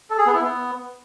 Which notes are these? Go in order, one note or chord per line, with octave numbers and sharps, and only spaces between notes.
A4
G#4
B3
E4
B3